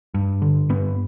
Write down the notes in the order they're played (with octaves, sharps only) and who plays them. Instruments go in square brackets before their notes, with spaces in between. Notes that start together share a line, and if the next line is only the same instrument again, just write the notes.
[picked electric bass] G2
D3
G2 B3